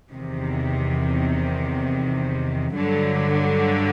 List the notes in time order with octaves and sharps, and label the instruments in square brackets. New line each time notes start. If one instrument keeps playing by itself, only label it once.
[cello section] E2 C3 D#3
G2 D3 F#3